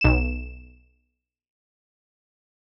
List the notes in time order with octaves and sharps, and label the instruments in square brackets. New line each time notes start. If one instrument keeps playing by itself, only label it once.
[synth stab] B1 E7